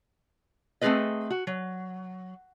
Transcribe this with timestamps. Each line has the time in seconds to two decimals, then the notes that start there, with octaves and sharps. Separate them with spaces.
0.81 A3 C4 F#4 G#4 B4 D#5
1.30 F#4
1.47 F#3